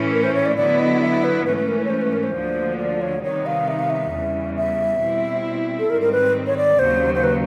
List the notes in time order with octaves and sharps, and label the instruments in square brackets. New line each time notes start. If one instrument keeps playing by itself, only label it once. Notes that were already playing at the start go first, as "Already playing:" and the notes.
Already playing: [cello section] A2 E3 A3 C#4 E4
[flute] A#4
C5
C#5
D5
[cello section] D3 F#3 B3 E4 [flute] D5
[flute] D#5
E5
B4
[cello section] G#2 E3 A3 C#4 [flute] B4
[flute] B4
A#4
B4
C#5
C5
B4
A#4
C5
[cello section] D2 D3 F3 A#3
[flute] D5
C#5
[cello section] C3 D#3 G3 B3 D#4 [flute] C#5
[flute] F5
E5
F5
E5
[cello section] E2 C#3 E3 G3
[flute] E5
[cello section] B2 G3 C4 E4
[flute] A4
[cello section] G#2 D#3 G3 C4 [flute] A#4
[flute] A#4
B4
C#5
D5
[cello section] D#2 C#3 F#3 [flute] C5
[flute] C5
B4